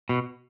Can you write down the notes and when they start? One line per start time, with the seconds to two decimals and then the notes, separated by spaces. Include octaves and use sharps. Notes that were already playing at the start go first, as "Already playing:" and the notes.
0.09 B2